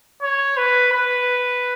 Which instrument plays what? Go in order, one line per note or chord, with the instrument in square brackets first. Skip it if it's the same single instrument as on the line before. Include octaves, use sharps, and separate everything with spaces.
[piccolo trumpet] C#5
B4
B4